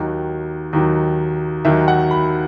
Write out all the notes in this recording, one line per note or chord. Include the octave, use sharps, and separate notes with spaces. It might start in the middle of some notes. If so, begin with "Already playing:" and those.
Already playing: D#2 D#3 F#3
D#2 D#3 F#3
D#2 D#3 F#3 E5
F#5
B5